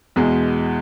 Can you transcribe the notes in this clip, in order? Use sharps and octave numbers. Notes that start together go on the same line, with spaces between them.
E2 B2 G#3